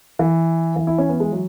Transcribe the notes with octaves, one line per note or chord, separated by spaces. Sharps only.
E3
E3
E4
C#4
B3
G#3
F#3